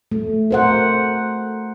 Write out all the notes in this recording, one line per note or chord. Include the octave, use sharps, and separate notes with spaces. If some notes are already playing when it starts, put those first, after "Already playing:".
A3
A#4 C5 F#5